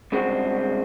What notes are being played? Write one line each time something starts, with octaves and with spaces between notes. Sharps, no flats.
C2 C#3 G#3 C4 D4 F#4